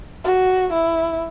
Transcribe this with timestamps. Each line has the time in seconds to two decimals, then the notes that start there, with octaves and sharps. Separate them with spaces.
0.24 F#4
0.73 E4